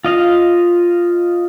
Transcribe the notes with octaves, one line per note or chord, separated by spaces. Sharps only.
F4 D#5 F5